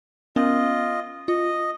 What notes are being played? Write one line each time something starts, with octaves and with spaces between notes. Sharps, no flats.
B3 C#4 F4 A#4 D#5
F4 D#5